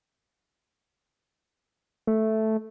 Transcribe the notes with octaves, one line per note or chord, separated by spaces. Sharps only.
A3